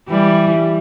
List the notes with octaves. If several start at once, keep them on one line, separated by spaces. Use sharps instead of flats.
E3 G3